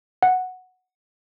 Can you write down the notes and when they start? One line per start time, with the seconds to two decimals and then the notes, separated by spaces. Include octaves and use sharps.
0.23 F#5